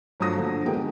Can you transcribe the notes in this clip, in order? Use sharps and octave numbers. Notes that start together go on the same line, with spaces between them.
G2 F3 F#3 A3 D#6 A#6
A#2 D3 F3
D3 D#3 G#3 B3 G4 A#4
G#3